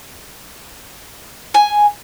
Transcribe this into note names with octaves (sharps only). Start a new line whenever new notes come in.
G#5